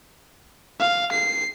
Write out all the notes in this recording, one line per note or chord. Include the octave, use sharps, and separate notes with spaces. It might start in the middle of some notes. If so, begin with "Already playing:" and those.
F5
C7